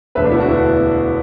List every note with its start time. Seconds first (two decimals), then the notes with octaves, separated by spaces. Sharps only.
0.15 E1 D2 D3 B4 E5
0.24 A3 D4
0.31 B3 E4
0.40 D4 F#4
0.48 B3 E4